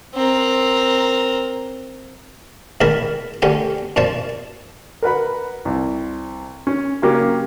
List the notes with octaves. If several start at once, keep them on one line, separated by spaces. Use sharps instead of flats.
C4 A#4
C#2 A#2 D#3 A#4 A5 B5
D2 D3 C#4 G4 D5
F#2 A#2 F3 D5 A5
A#4 B4 F#5 B5
C2
C#4
C#3 F#3 A#3 C#4 F#4 G4